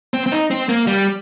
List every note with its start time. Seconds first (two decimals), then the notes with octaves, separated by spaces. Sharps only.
0.14 C4
0.26 C4
0.32 D#4
0.51 C4
0.69 A#3
0.87 G3